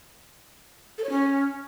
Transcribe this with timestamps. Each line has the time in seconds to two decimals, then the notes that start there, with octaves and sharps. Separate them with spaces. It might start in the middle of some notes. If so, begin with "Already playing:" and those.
0.98 A4
1.04 C#5
1.09 C#4